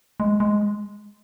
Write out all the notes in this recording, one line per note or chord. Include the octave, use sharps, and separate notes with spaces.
G#3
G#3